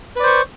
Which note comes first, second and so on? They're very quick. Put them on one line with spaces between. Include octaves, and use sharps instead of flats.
B4 D5 C5 C#6